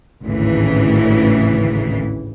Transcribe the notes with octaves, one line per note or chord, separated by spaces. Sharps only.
G#1 D2 A2 C#3 E3